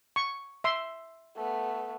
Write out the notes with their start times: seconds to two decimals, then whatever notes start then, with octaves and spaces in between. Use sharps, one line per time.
0.16 C#6
0.64 E5 C6
1.36 A3 B3